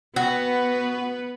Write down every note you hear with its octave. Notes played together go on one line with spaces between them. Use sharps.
B3 F#4 B4